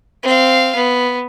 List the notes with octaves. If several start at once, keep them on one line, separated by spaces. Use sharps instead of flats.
C4 F5
B3